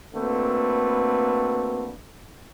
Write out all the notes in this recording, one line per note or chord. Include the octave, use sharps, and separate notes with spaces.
D3 A3 A#3 C4 F#4 B4